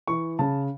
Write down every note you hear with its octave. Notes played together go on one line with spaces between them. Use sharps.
E3 C#6
C#3 A5